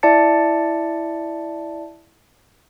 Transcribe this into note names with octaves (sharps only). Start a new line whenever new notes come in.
E4 D5 E5 A5 A6 C#7